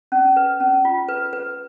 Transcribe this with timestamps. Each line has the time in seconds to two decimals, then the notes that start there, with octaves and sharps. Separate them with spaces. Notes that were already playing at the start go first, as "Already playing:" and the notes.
0.12 C#4
0.36 B4
0.60 C#4
0.85 F4
1.08 B4
1.33 B4